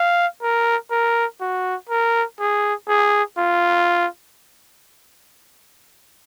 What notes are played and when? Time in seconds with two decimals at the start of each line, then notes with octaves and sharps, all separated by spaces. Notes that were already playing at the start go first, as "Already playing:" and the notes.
Already playing: F5
0.42 A#4
0.91 A#4
1.41 F#4
1.89 A#4
2.40 G#4
2.89 G#4
3.38 F4